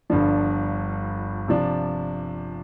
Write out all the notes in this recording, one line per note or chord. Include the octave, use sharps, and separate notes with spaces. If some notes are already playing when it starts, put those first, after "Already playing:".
G1 G2 D3 F3 D4
C3 F3 D4